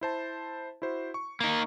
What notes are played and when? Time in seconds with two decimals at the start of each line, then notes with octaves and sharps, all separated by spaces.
0.01 E4 C5 A5
0.82 E4 F#4 C5
1.14 C#6
1.41 A#3 D#4